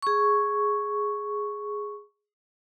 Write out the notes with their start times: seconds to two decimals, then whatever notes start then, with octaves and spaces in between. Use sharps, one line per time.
0.02 G#4 C#6